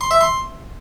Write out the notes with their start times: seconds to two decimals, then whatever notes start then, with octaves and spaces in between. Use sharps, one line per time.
0.01 C6
0.11 E5
0.21 C6